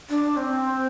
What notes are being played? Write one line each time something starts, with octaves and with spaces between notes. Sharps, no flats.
D4
C4